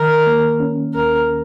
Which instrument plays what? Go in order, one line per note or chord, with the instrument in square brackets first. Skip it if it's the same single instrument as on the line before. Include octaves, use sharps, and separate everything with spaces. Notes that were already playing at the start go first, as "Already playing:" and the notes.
Already playing: [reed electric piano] D#3 [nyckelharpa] A#4
[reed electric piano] A#3
C#4
[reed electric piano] D#2 [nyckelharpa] A#4